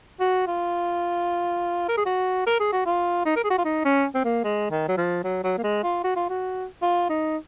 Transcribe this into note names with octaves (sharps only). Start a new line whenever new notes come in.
F#4
F4
A#4
G#4
F#4
A#4
G#4
F#4
F4
D#4
A#4
G#4
F#4
F4
D#4
C#4
C4
A#3
G#3
D#3
F#3
F3
F#3
F#3
A#3
G#3
F4
F#4
F4
F#4
F4
D#4